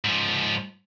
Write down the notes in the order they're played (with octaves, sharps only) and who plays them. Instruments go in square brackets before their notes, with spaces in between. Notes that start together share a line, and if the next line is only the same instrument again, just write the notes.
[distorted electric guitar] G#2 F3